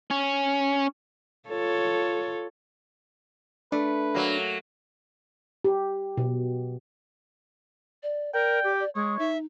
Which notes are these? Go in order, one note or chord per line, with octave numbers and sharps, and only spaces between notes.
C#4
F4 A4 C#5
A3 D4 B4
F#3 A#3
G4
B2
D5
A#4 D5 G5
G4
D5
G#3 C#5 D#6
D#4 E5